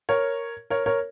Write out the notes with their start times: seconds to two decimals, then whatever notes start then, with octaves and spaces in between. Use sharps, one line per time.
0.09 A#4 C#5
0.70 A#4 C#5
0.86 A#4 C#5